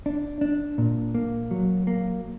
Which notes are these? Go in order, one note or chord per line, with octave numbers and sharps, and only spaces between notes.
D4
D4
A#2
A#3
F#3
A#3